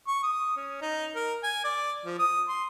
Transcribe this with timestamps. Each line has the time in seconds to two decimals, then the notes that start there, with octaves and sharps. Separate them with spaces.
0.08 C#6
0.23 D#6
0.57 C#4
0.82 D#4
1.16 A#4
1.44 G#5
1.65 D5
2.05 F3
2.19 D#6
2.49 C6